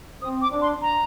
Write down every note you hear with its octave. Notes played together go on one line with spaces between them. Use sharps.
C4 D#6
D6
D4
C6
A#5